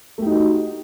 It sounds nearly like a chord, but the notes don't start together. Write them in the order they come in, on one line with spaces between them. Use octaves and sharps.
A3 G4 D#4 F#4